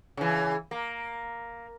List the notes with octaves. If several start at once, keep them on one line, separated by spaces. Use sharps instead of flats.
C#3 E3
A#3